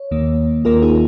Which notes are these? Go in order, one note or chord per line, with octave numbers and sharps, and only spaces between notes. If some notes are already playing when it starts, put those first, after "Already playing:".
Already playing: C#5
D#2 D#3 A#3
D#2 D#3 A#3 F4 A#4
D#4 G#4